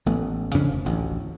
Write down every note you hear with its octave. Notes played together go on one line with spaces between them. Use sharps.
A1 A3 B3
F2 C#3 C#4 D4
F1
A1 D2